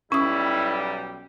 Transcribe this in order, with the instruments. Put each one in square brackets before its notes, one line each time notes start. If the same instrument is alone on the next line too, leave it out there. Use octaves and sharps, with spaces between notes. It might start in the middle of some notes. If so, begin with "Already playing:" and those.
[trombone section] B1 G3 [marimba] C#4 D#6 [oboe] E4